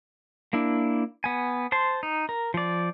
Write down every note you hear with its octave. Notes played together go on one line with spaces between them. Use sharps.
A#3 D4 E4
B3 G#5
C5 A5 C6
D#4
A#4
F3 D5